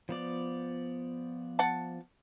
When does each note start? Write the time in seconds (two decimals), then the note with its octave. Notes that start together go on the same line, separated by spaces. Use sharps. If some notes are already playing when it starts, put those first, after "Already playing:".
0.09 F3 B3 D5
1.59 F#5 A5